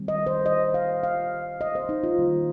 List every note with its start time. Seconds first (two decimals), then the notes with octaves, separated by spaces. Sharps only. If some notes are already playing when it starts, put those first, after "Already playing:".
Already playing: D#3 G3 C4
0.08 D#5
0.27 C5
0.46 D#5
0.74 F5
1.03 F5
1.61 D#5
1.75 C5
1.89 D#4
2.04 F4
2.18 D#3 G3 A#3